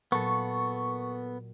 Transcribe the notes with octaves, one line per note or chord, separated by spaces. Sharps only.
A#2 F#3 B3 A4 C#6 C7